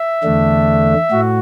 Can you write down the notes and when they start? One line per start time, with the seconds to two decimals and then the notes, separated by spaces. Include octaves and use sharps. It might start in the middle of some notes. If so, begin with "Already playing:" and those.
Already playing: E5
0.23 E2 D3 A3 D4
1.11 A2 F#4